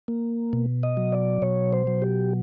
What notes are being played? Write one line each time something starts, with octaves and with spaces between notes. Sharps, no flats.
A#3
B2
D#5
F#3
D5
B2 C#5
C5
F#3
G4